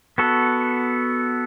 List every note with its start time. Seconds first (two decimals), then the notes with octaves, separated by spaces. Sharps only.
0.18 B3 F#4 A4